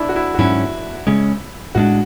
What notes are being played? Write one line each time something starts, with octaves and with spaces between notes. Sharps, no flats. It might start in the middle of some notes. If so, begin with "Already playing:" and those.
Already playing: D4 E4
F#4
E4
F#4
G#2 F#3 C#4 E4
C#3 G#3 C#4
A2 G#3 D4 F#4